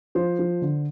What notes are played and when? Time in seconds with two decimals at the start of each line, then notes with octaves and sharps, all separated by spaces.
0.15 F3 C5
0.39 F3
0.62 D3